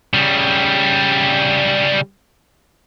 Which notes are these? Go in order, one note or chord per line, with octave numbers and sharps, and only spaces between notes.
C#3 G3